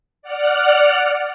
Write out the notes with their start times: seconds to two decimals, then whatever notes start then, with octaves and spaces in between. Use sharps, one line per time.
0.22 D5 F#5 F6